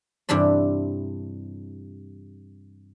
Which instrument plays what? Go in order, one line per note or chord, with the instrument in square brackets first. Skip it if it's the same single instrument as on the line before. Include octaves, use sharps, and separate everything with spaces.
[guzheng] G2 C3 E3 D4 D5